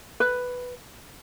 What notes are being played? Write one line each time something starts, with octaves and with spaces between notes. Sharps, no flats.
B4